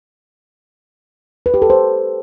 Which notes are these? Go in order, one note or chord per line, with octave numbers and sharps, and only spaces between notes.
B4
G4
A4
C5